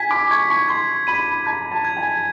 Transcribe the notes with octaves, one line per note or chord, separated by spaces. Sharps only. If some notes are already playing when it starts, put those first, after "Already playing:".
Already playing: G#5 G#6 B6
D6
C#6 G#6
C#6
C6 G#6
B5 D#7
A#5 G#6
A5
G#6
G#5